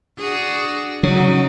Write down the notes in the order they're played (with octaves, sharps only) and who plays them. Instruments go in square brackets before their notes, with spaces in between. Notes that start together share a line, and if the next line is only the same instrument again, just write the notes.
[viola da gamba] D4 F#4 G#4
[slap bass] C#3 [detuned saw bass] F#3 [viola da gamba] D#4